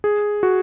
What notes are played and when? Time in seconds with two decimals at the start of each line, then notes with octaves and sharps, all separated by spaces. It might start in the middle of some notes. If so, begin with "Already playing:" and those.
0.04 G#4
0.43 F#4